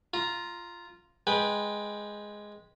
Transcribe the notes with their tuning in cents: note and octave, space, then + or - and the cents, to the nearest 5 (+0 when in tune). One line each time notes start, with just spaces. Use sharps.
F4 -5 A#5 +5
G#3 +0 B4 -15 G5 +5